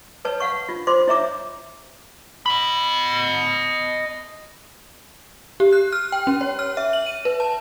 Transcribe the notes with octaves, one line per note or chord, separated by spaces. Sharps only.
B4 C#5 A5
F5 F#5 C#6
F4
F4 C5 C6 D6
E4 C#5 E5 A#5 D6
D#5 B5
G4
F#6
F6
G5
C#4
C#5
F6
E5
F#7
D#7
B4
A5